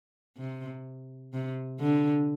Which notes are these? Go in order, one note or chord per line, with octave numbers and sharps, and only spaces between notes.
C3
C3
D3